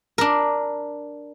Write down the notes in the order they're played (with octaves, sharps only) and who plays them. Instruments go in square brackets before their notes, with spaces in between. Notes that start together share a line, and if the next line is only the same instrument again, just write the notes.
[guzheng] D4 A#4